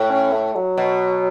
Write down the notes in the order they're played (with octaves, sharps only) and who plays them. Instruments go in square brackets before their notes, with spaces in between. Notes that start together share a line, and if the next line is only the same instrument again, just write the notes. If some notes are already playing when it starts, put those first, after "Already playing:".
Already playing: [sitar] A2
[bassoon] C#4
A3
F#3
[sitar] B2